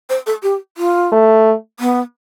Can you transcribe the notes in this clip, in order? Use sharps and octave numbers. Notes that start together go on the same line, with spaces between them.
C5
A4
G4
F4
A3
B3